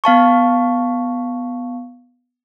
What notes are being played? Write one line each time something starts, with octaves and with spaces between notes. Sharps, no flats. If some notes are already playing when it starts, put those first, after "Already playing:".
B3 F5 A5 C#6